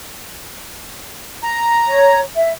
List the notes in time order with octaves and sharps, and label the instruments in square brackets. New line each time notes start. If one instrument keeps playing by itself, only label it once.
[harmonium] A#5
[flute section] C#5
E5